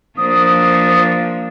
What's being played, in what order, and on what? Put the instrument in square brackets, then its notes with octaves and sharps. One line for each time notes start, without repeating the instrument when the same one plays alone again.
[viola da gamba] F3 A#3 D4 [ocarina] D#6